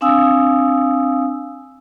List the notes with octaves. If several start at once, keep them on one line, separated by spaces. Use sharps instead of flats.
C4 D4 F5 G#5 D#6 E6